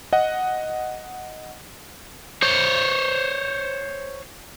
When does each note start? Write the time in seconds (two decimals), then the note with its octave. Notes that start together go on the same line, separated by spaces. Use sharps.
0.13 D#5 F#5
2.42 C5 C#5